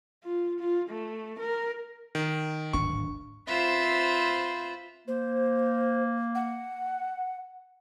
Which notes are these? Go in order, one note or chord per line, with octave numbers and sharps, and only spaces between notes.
F4
F4
A3
A#4
D#3
D1 G#1 D4 C#6
C4 F4 B4 C5 E5 F5
A#3 C5
F#5